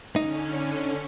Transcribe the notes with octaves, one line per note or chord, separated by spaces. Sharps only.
D3 C#4 D#4